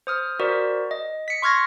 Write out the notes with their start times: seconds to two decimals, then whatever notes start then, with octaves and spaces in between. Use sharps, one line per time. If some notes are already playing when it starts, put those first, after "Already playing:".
0.07 C5 D#6 F6
0.40 F#4 A#4 C5 D5
0.91 D#5
1.28 B6 C#7
1.42 C6 C#6 F6 G#6 A#6